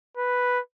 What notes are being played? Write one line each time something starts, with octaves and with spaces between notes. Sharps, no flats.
B4